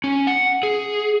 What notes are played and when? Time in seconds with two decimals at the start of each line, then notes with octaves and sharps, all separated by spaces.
0.04 C#4
0.27 F#5
0.63 G#4